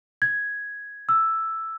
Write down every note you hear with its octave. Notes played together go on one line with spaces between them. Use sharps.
G#6
E6